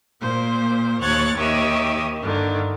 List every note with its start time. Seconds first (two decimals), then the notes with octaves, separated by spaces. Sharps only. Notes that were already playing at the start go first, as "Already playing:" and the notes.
0.21 A#2 A#3 C5
1.01 D#2 C#5 C#6 F#6 G#6 A6
1.37 D#2 D#3 G4 C#5 D#5 E5
2.21 G2 D3 D#3